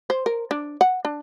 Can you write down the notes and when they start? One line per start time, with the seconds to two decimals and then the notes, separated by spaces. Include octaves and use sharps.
0.10 C5
0.26 A#4
0.51 D4
0.81 F#5
1.05 D4